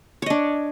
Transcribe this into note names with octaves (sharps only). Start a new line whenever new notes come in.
D4 C#5 D#5